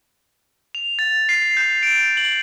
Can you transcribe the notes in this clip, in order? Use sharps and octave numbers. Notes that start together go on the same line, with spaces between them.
F7
A6
C7
G6
D7
F#7